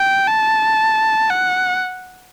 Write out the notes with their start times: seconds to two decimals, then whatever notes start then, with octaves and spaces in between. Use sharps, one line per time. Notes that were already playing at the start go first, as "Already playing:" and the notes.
Already playing: G5
0.27 A5
1.30 F#5